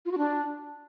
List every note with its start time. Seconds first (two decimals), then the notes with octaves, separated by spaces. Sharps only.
0.05 F4
0.11 F#4
0.18 D4